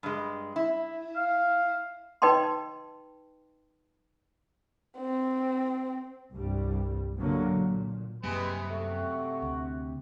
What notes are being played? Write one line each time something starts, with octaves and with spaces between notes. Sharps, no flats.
G2 G#3
E4
F5
D#4 B4 D#5 G5 A5 C6
C4
C2 G2 G3
B2 D3 F#3 A#3
A#2
F#2 C3 G3 G#3 A#3 G#4 B4
A3 F#4
D2